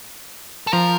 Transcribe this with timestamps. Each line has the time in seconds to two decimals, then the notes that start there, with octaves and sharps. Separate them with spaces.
0.67 A4
0.73 F3 A#4